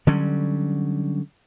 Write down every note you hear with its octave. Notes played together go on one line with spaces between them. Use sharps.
D3 F#3 G3 C#4